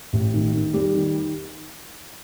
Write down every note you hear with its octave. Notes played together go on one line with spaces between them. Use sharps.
A1
D#3
D#3
G3
D#3